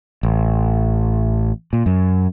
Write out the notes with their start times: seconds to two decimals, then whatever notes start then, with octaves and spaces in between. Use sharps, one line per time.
0.23 A1
1.73 A#2
1.86 F#2